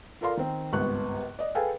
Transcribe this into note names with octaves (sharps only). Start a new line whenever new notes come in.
F4 A4 A#4 D5 F5 C6
D#3 C4
G#1 C#2 G2 B3 C#6 F#6
D5 D#5
G#4 A4 B4 F5 G5 G#5